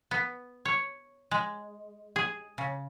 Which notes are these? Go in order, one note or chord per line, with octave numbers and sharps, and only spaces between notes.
B3
C#5
G#3
G#4
C#3